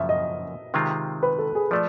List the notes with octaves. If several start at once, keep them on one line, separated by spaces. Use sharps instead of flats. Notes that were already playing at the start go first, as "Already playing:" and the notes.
Already playing: F#2 C#3 F3 A#3 E5
D#5
C3 D#3 G#3 C4 F4
B4
A4
G#4
F3 A3 D5